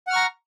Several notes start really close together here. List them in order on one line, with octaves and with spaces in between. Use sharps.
F#5 F6 C#6 A#5